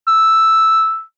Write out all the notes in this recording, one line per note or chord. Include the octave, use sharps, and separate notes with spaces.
E6